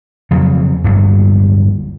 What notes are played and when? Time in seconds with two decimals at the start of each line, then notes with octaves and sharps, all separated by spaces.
0.31 F2 C#3 F#3
0.84 D1 G1 G2